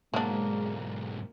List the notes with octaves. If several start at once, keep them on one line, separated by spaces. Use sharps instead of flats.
B1 G#2 F#3 G#3 A#3 D4